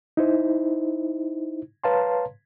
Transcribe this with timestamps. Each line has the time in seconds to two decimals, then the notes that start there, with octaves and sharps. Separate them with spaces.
0.17 D#4 E4 C5
1.84 B4 C#5 F5 A5 A#5 C6